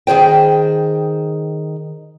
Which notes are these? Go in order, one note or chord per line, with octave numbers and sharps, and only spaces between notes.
D#3 G#4 C5 G5